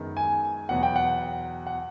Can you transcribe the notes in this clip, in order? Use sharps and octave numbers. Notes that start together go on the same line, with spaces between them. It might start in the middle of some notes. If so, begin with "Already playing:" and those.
Already playing: F#2 D#3 G#3 B3
G#5
E2 B2 F#3 B3 F#5
G5
F#5
F#5